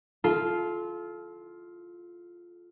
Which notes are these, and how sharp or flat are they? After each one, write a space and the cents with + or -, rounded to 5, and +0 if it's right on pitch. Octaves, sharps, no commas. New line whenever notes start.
F4 +0 A4 -30